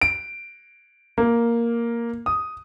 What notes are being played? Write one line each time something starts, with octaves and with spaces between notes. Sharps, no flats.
D7
A#3
D#6